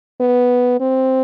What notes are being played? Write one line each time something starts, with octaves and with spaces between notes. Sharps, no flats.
B3
C4